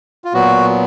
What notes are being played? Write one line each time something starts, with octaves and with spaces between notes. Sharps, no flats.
F4
A#2 F#3 B3 F#4